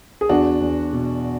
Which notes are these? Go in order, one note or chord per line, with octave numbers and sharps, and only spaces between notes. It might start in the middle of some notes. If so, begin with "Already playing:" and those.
G#4
E2 D4 F#4
E2
B2